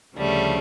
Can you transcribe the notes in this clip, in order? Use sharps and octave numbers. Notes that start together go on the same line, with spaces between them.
D2 C#3 F3 G3 A3